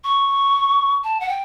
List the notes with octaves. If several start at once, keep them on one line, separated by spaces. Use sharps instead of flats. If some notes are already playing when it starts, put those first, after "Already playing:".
C#6
A5
F#5
G5